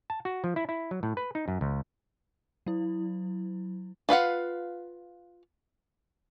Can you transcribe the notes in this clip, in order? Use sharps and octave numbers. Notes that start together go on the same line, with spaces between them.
A5
F#4
F3
E4
E4
F#3
A2
B4
D#4
F#2
C#2
F#3 E4
F4 B4 F5 F#5